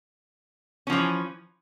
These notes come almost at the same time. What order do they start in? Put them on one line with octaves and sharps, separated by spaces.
C#4 F3 E3